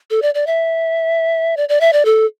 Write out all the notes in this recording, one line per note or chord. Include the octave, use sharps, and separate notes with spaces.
A4
D5
D5
E5
D5
D5
E5
D5
A4